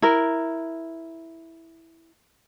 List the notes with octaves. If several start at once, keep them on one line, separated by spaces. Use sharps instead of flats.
E4 A#4